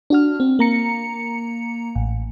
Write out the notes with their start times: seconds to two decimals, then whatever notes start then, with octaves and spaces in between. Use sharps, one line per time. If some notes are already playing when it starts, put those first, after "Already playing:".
0.10 D4 F#4 F6
0.40 C4
0.59 A#3 A#5 C#7
1.95 A1